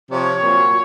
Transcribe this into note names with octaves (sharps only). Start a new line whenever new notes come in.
C3 F3 C#5
A#2 F#3